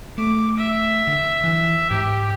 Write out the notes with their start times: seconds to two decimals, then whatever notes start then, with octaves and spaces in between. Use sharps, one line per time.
0.18 A3 D6
0.58 E5
1.07 D3
1.44 E3
1.91 G#2 G4